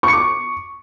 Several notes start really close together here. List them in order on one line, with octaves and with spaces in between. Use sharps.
C#6 C#7 D6